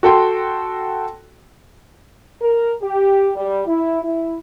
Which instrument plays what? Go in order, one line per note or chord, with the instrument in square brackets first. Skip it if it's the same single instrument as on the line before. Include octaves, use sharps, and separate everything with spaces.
[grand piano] F#4 A4 G5 C6
[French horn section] A#4
G4
G3
E4
E4